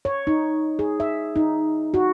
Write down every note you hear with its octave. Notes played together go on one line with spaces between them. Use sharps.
C#5
D#4
G#4
E5
D#4
F#4